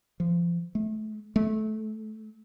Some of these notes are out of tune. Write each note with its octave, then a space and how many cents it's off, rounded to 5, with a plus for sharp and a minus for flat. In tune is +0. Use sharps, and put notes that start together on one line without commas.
F3 -30
A3 -30
A3 -20